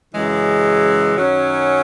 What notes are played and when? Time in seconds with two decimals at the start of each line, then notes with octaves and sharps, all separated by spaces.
0.13 F#2 C#3 E3 G#3
1.16 F#2 D#3 F#3 C#4